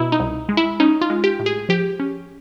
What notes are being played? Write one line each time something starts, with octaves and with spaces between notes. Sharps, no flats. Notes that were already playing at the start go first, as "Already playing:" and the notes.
Already playing: B2 D#4 E4
D#4
C2
G#3
E4
C#4 D#4
F4
G#3
G4
A2
G#4
F3 G4
C#4